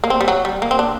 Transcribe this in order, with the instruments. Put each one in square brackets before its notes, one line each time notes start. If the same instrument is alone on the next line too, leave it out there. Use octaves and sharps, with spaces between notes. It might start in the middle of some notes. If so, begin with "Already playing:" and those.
[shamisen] A#3
C4
G3
F#3
G3
A#3
C4
D4